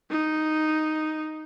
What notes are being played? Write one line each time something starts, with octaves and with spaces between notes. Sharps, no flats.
D#4